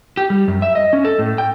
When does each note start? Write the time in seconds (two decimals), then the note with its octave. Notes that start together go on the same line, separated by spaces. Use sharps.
0.17 G4
0.30 G3
0.48 F#2
0.62 E5
0.75 D#5
0.93 C#4
1.04 A4
1.19 A2
1.38 G5